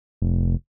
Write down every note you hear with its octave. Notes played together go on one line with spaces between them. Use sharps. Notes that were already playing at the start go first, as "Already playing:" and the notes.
F1